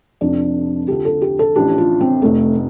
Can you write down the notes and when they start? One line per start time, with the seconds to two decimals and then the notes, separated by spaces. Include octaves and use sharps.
0.21 F1 F2 C3 D4
0.88 D2 D3 F3 G4
1.05 A4
1.22 G4
1.39 A4
1.56 A1 A2 F3 D4 G4
1.78 F4
2.01 C4
2.22 F1 F2 C3 A3